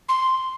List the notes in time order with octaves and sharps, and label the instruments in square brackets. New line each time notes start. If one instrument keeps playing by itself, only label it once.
[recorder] C6